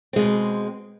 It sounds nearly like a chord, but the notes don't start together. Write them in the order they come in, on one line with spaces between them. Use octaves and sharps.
C4 G#3 B2